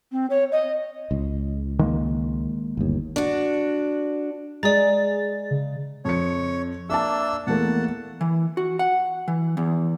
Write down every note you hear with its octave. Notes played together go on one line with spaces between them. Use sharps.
C4
C#5
D#5
C#2
D#3 G#3 A#3
G1 D#2
D4 F#4
G#3 G#4 D5 A#5 A6
C#3
F2 C#5 C#7
A#3 D4 E5 A5 E6
E2 A3 A#3 F#5 A5
E3
F#4
F#5
E3
E2